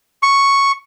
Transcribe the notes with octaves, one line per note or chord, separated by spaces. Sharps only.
C#6